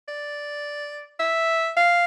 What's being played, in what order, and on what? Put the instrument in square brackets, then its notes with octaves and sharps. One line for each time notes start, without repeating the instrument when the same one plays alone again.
[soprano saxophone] D5
E5
F5